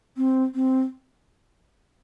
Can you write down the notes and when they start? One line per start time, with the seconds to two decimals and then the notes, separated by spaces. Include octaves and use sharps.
0.17 C4
0.55 C4